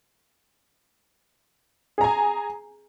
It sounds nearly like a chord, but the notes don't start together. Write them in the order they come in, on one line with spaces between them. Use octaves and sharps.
G#4 A#5 G#5